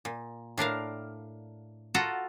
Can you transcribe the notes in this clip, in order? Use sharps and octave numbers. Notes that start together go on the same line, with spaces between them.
A#2
A2 D4 A#4 F5
F4 F#4 A4 A5 A#5